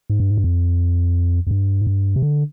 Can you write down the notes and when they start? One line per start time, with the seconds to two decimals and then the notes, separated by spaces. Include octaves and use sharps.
0.10 G#2
0.20 G2
0.30 G#2
0.38 G2
0.44 F2
1.47 F2
1.51 G2
1.81 G#2
1.87 G2
2.16 C3
2.22 D3